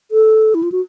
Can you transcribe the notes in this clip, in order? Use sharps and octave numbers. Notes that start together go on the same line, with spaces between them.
A4
E4
F4
F#4